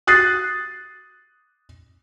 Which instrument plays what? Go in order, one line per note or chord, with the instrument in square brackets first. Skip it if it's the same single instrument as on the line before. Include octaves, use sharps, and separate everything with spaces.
[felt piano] D#6 F#6 A6 C7